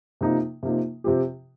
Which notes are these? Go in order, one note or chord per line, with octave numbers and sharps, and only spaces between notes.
C3 F3 A#3 D#4
C3 F3 A#3 D#4
C3 F3 C4 G4